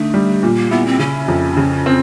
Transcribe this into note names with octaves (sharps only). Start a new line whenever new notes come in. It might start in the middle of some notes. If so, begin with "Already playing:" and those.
Already playing: D3 A3 D#4
G3
A#2
A#3
B3 E4
C4
C#3 C#4
F2
C#3
C4